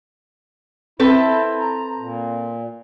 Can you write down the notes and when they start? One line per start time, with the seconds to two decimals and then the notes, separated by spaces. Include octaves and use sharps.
0.99 C4 E4 A4 B4
1.60 A#5
1.97 A#2